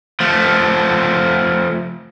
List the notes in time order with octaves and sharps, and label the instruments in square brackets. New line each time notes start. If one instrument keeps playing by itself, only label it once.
[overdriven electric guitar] F3 A3